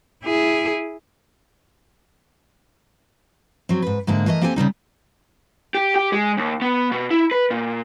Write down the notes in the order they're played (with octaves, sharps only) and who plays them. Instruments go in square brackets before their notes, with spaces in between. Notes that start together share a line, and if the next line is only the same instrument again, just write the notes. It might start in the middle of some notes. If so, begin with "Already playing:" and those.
[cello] E4 G#4
[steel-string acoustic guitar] F#3 C4
G#2 B4
G#2 D3 A#3 E4
E3 A3 A#4 C5 D#5
A#3 C4 G4 A4 C5 G#5
C#3 F#3 G3 D#4
[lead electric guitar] G4
G4
G#3
D#2
B3
B2
E4
B4
A#2